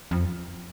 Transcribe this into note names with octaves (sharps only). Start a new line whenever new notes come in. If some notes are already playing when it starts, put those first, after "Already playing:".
F2